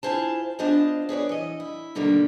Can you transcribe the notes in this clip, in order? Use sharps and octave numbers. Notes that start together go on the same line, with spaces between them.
E4 F4 G#4 C5 A5
B3 D4 F4 C5 D#5 A5
G#4 B4 C#5 D5
E3 D#5
E4
B2 D3 D#3 G3 A#3